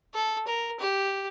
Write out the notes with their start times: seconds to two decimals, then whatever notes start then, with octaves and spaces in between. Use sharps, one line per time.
0.14 A4
0.47 A#4
0.79 G4